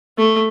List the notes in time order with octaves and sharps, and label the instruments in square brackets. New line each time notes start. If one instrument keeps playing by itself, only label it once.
[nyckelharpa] A3